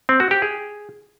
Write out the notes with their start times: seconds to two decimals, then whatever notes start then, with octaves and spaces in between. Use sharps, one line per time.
0.09 C4
0.20 F#4
0.31 G4
0.42 G#4